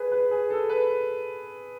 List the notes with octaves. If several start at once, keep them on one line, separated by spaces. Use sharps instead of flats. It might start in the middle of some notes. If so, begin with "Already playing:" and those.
Already playing: G#4 B4
B4
G#4
A4
B4